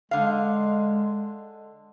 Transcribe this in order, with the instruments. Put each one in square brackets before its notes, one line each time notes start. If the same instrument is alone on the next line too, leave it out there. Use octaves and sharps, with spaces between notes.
[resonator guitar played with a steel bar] D3 F5 [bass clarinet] G#3